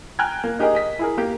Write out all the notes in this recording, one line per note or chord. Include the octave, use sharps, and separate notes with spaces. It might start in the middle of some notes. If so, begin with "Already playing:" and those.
G5 G#5 A#5 F6 F#6 G#6
A#3
D#4 G4 G#4 A#4 D#5
D#5 B6
E4 G#4 A#4
A#3 G4